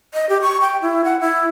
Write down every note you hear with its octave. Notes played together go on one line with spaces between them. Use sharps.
D#5
G4
C#6
G5
E4
F#5
E4